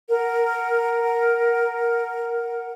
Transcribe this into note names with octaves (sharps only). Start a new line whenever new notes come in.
A#4 F#5